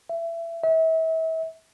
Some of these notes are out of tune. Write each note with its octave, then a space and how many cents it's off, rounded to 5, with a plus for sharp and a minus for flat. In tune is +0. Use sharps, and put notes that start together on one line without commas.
E5 +25
E5 -35